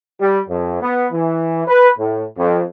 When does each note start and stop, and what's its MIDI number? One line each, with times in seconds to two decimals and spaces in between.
0.20 0.39 55
0.48 0.81 41
0.82 1.06 59
1.12 1.62 52
1.67 1.88 71
1.98 2.24 45
2.37 2.62 41